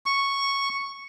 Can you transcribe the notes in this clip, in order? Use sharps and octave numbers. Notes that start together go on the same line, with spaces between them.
C#6